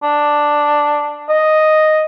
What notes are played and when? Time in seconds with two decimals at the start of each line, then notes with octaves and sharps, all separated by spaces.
0.03 D4
1.29 D#5